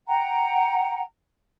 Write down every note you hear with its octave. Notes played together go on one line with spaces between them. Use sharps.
F#5 G5 A#5